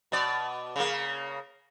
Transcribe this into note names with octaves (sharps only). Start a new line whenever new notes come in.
B2 D5
C#3 A#3